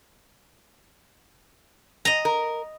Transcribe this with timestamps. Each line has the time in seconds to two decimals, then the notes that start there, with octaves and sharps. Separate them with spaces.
2.05 D#5 A#5
2.25 A#4